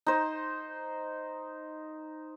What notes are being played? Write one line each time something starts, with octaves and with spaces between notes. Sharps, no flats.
D#4 C5